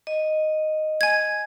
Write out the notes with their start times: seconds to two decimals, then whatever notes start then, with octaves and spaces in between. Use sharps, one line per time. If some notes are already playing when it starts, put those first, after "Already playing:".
0.07 D#5
1.01 G#5 G#6